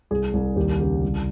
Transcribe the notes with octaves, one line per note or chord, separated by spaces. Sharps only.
C2 G#4
C2
D#2 G4
C#3 G4
C2